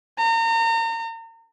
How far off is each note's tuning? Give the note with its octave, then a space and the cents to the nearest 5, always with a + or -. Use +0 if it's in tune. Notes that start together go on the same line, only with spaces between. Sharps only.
A#5 -35